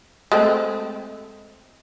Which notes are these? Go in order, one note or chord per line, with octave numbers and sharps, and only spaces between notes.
G#3 A3 C4